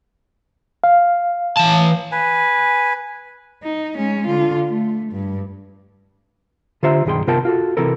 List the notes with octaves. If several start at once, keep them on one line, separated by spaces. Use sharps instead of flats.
F5
E3 A5
B4 G#5
D#4
G#3 C#4
D3 F4
A3
G2
D3 F4 G4 C5 E5 A#5
B1 G2 D#3 G#4 G5 C6
C3 B3 F4 A#4 G5 A5
F4 F#4 A4
C3 E3 A4 A#4